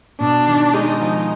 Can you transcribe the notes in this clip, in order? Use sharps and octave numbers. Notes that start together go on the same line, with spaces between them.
B2 D4
D#3
G#3 D#4
F3